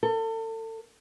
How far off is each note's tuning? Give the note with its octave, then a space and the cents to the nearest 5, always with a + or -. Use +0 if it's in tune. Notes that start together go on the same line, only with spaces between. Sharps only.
A4 +35